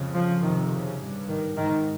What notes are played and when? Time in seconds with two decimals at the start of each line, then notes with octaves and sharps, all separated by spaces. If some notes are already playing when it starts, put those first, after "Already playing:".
Already playing: F2 C#3
0.14 F3
0.42 F2 C3 D#3
0.71 C#3
0.99 G2
1.28 D#3
1.57 G#2 D#3